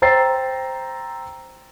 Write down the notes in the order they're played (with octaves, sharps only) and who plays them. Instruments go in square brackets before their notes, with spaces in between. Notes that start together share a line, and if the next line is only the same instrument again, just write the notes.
[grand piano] C5 G5 A#5 E6 A6 C7